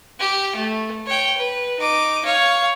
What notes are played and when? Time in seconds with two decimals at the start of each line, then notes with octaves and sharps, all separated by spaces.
0.20 G4
0.55 A3
1.07 C#5 G5
1.37 B4
1.79 D#4 D6
2.25 C#5 F5